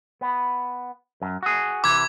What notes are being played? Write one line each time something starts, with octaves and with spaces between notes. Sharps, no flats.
B3
F#2
F#4 G#4
C3 E3 D6 G#6